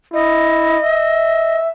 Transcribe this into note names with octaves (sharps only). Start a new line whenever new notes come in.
E4 D#5
E5